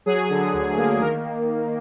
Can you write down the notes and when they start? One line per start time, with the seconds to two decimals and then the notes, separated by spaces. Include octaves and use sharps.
0.06 F#3 G#4
0.30 D3
0.54 D2
0.77 A#3
1.00 D#3 A#4